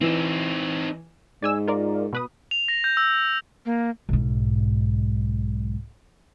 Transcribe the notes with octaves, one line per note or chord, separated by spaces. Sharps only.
E3 C4 D#4 E7
G#2 D5 G#5 E6
F4 A#4 D5
B2 B4 D#6
F7
A#6
G6
E6
A#3
B1 G#2